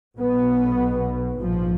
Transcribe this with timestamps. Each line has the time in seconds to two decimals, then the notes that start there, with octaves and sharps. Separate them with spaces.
0.18 B1 B2 B3
1.41 A#1 G#2 F3